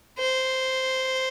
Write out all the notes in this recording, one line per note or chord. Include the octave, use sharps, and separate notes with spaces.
C5